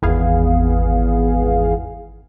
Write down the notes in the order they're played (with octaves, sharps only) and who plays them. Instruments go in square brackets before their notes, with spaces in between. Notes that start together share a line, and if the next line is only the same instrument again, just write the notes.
[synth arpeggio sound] G#1 E2 B3 G#4 F5